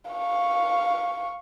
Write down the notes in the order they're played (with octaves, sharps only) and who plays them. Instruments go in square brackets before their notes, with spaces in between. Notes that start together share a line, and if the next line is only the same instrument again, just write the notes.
[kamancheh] F5 C#6